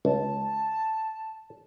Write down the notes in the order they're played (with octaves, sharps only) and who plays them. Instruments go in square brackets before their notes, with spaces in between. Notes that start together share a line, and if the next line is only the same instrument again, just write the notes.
[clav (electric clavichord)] C#2 [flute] A5